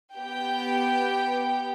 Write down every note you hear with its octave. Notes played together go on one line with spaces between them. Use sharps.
B3 G4 G5